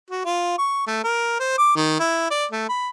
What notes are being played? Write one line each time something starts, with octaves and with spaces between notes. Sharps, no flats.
F#4
F4
C#6
A3
A#4
C5
D6
D#3
E4
D5
A3
B5